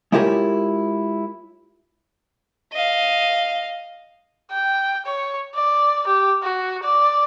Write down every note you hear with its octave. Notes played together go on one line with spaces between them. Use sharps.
G#3 E4 F4 G4 A#4 C#5
D#5 F5
G5
C#5
D5
G4
F#4
D5